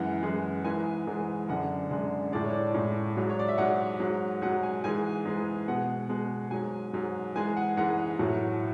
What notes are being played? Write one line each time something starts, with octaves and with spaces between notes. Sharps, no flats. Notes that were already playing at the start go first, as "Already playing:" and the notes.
Already playing: F#2 E3 G#3 F#5
F#2 E3 G#3
G#2 E3 G#3 G#5
G#2 E3 G#3
F#2 D3 G#3 F#5
F#2 D3 G#3
A2 G#3 D5
C#5
D5
A2 G#3
G#2 F#3
C#5
D5
E5
G#2 F#3 F#5
G#2 F#3
G#2 F#3 F#5
G#5
G#2 E3 G#3 G#5
G#2 E3 G#3
B2 G#3 F#5
B2 G#3
G#2 F#3 G#5
G#2 F#3
G#2 E3 G#3 G#5
F#5
G#2 E3 G#3 F#5
A2 F#3